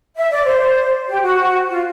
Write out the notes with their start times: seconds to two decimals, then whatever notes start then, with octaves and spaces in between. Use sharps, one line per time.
0.16 E5
0.31 D5
0.46 C5
1.08 G4
1.23 F#4
1.69 F4